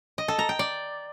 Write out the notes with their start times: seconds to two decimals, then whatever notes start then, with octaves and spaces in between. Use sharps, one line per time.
0.18 D#5
0.28 A4
0.39 A#5
0.49 G5
0.59 D5